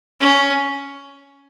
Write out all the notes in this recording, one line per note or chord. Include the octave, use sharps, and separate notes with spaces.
C#4